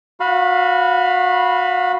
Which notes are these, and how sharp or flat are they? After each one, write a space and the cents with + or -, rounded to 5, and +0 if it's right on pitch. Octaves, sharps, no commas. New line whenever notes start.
F#4 -25 F5 +0 B5 -5